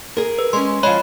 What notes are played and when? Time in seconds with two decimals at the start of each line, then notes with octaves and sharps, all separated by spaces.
0.17 G#4 A#4
0.39 B4
0.53 G#3 C#4 C6
0.83 F3 G#3 C#5 D#5 B5